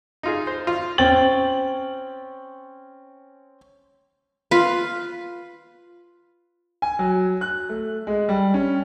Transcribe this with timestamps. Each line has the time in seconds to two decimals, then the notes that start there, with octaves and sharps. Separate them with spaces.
0.23 D#4 F4 G#4
0.47 C5
0.67 F4
0.98 C4 C#4 G5 A6 F#7
4.51 F4 B4
6.82 G#5
6.99 F#3
7.41 F#6
7.69 A3
8.07 G#3
8.29 G3
8.54 C#4